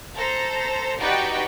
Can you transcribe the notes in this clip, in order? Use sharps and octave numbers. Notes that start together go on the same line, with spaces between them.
A4 C5 A#5
D#4 F#4 G4 B4 D5 G5